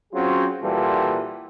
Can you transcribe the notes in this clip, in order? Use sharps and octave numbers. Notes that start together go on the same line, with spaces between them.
F#3 C4 C#4 F4 F#4 G#4
A#2 E3 G3 F4 F#4 A4